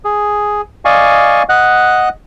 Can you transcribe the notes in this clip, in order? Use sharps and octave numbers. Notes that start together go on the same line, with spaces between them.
G#4
D5 D#5 F5 G#5 C#6
D#5 F#5 F#6